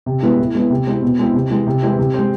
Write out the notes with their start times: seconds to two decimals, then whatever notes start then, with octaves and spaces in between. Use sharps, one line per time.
0.06 C3
0.22 G#3 B3 E4
0.39 A2
0.55 G#3 B3 E4
0.70 C3
0.87 G#3 C4 E4
1.02 B2
1.19 G#3 C4 E4
1.34 C3
1.50 E3 G#3
1.67 C3
1.82 E3 G#3 C4 E4
1.99 C3
2.14 G#3 C4